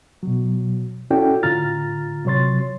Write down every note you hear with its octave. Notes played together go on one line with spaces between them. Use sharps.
B2 F#3
C#4 E4 F#4 A4 D5 G5
A2 D3 F4 A#5 F6 A6
C3 F#3 C#5 C6 A6